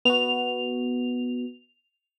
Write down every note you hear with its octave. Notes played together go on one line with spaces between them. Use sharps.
B3 F#4 F7